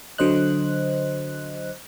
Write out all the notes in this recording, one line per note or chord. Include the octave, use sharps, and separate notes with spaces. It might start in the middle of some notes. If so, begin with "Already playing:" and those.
D3 F#3 C5 D#5 F#6